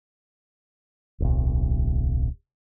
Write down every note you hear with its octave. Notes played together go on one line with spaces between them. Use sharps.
D1 B1